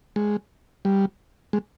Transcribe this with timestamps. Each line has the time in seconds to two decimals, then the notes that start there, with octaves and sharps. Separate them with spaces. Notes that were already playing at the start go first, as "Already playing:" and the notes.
0.16 G#3
0.85 G3
1.53 G#3